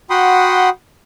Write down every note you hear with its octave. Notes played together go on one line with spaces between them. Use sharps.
F#4 F#5 G5 B5 C6 D#6